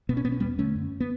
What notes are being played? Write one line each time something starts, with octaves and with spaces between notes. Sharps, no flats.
B2 B3
C#4
B2 B3
C#4
E2 G3 B3
D3 A3 C#4
F#2
B3